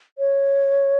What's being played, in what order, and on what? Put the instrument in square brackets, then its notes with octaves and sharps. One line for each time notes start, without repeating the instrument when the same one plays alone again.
[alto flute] C#5